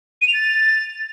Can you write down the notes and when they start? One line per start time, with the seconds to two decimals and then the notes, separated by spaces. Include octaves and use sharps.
0.22 D#7
0.28 F7
0.34 A6